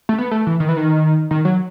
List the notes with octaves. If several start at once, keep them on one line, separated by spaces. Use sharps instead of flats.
A3
B3
A3
E3
D#3
E3
D#3
D#3
F#3